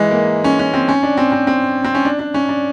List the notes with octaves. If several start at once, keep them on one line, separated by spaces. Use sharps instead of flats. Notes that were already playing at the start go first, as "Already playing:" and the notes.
Already playing: E3 G#3
A#3
C#4
C#4
C4
C#4
D4
C4
C4
C4
C4
C#4
D4
D4
C#4
D4